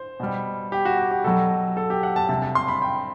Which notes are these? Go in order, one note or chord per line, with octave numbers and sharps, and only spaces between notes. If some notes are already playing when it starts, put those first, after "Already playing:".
Already playing: C5
B2 G3
G4
F#4
G4
G4
B2 F#3 A4
A4
G4
F#5
A5
C3 G3 A5
A5
C6
B5
G5